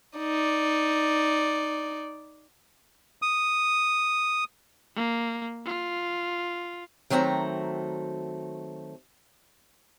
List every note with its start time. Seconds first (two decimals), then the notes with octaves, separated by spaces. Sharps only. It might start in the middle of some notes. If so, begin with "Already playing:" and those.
0.18 D#4 D5
3.22 D#6
4.96 A#3
5.65 F4
7.10 D#3 F#3 A3 C4 A5 A#5